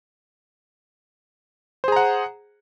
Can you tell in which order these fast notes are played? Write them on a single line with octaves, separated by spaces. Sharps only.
C5 G#4 A#5 F#5